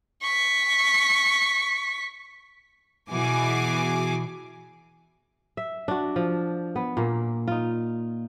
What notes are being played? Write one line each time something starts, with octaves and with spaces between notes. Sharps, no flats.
C#6 B6
B2 E3 F#4 G#4 G#5 D6
E5
D4 F#4
F3
B3
A#2 A#3
D#4 F4